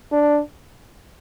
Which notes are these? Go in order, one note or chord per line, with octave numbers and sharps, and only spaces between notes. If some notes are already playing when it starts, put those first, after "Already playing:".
D4